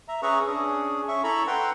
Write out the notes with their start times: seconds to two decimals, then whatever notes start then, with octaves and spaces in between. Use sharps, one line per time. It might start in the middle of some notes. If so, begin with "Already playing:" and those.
0.08 E5 A#5
0.22 C#4 G#4 B4 E5 A#5 C#6
0.47 C#4 D4 G#4
1.08 C#4 E5 C#6
1.24 E4 A4 A#5 B5 C#6 E6
1.47 B4 F#5 G5 A#5 C6